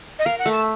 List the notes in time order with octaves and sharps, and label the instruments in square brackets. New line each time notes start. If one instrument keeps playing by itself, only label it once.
[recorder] D#5
[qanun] A#4 [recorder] F5
[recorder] F#5
[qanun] A3
[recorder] A5